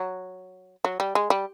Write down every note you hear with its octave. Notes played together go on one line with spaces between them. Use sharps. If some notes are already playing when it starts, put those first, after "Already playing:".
Already playing: F#3
F#3
G3
G#3
G3